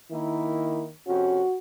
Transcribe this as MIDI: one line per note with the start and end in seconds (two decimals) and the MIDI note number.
0.12 0.92 51
0.12 0.83 58
0.12 0.83 64
1.07 1.41 41
1.07 1.41 48
1.07 1.41 61
1.07 1.59 66